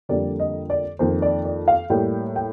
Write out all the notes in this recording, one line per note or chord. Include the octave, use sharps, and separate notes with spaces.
F2 D3 G3 A#3 D5
D#5
D5
F2 D#3 A#3 C5
D5
D5
F5
A2 G3 A#3 G5
G5